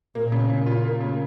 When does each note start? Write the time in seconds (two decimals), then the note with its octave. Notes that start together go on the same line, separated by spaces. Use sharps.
0.15 A#2 A#3
0.32 C#3
0.49 A#2 C#3
0.66 F4
0.84 A#3
1.01 C#3